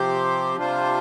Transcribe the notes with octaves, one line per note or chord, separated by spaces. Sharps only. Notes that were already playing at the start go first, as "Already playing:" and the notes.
Already playing: C3 F3 C4 G4 C5
C3 G3 D4 F4 C5